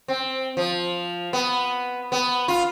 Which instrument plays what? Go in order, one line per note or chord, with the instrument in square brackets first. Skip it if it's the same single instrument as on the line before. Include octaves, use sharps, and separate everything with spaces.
[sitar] C4
F3
B3
B3
F4